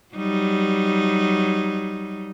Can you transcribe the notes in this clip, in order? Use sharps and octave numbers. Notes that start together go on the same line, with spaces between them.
F#3 G3 D#4